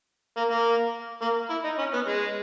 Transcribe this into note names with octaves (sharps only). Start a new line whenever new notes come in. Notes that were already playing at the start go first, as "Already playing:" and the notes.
A#3
A#3
A#3
E4
D#4
C#4
B3
G#3